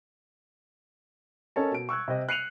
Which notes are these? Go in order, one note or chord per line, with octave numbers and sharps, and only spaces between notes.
C#4 A4 A#4 C#5 D#5 A5
B2 D7
C#6 E6 F#6 G#6
C3 D#5
F#6 C7 C#7 D#7 F7 F#7